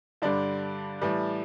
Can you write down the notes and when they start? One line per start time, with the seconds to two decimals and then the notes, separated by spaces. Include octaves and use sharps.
0.22 G2 D3 G3 D4
1.01 A2 E3 G3